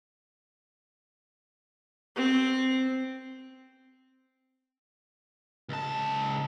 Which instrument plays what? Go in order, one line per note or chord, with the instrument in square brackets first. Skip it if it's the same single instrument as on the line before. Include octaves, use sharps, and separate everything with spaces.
[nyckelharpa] C4
[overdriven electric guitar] C#2 A5